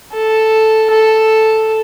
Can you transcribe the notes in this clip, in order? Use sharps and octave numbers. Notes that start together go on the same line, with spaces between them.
A4
A4